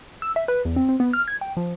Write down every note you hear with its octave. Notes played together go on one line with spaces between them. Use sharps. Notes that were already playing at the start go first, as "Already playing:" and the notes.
E6
E5
B4
E2
C4
C4
B3
F6
G#6
G5
F3